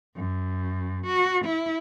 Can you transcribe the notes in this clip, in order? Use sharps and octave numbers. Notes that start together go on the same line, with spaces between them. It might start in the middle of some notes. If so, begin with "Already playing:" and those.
F#2
F#4
E4